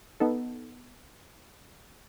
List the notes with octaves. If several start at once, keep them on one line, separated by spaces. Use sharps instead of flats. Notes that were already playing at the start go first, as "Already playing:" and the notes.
B3 D#4 A4